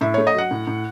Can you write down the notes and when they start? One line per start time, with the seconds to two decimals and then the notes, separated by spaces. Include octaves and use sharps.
0.01 A2 E5
0.14 A3 C#5
0.27 D#5
0.34 F#3 F#5
0.51 A2
0.67 A2